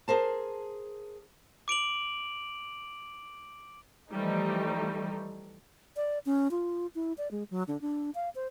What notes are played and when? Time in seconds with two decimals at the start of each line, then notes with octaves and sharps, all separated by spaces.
0.08 G#4 A#4 C5 A5
1.68 D6 D7 F7 F#7
4.11 E3 F3 G3 A3 D#4
5.96 D5
6.26 C#4
6.51 F4
6.95 E4
7.18 D5
7.31 G#3
7.51 F#3
7.68 D3
7.81 D4
8.15 F5
8.35 C5